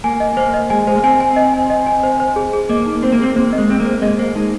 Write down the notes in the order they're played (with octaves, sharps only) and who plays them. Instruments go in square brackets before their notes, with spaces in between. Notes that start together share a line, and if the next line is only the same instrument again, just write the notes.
[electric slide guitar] A#3 [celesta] G#5
[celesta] D#5
[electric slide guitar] A#3 [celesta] C5
[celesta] D#5
[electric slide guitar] G#3 [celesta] G#5
[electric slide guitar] G#3 [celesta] C5
[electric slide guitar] A#3
[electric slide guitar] C4 [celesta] G#5
[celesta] G#5
D#5
G#5
D#5
G#5
C5
C5
G#4
G#4
[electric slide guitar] A#3 [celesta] D#5
[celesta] D#4
[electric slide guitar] C4 [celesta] C5
[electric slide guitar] A#3
[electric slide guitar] C4 [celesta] G#4
[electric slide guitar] A#3 [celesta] C5
[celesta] D#5
[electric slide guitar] G#3
[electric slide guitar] C4 [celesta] G#4
[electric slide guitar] A#3
[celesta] C5
[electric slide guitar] G#3 [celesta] D#5
[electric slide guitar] A#3 [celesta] C5
[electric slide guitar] G#3 [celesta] D#4